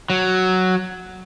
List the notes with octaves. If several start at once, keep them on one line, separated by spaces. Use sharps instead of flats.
F#3